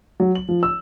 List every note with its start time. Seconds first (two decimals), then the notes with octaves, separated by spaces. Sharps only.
0.20 F#3
0.35 F#7
0.49 F3
0.63 E6